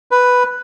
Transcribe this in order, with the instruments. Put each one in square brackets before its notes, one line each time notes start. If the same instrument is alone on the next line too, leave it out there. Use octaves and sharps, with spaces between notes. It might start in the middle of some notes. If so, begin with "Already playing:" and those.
[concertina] B4